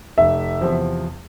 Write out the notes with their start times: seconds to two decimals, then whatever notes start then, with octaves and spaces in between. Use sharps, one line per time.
0.18 F1 E5
0.61 E2 C3 F3